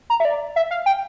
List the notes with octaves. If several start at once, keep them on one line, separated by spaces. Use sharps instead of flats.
A#5
E5
D5
E5
F5
G5